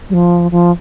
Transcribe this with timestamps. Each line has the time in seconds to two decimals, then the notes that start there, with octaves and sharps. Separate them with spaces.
0.10 G3
0.14 F3
0.52 F3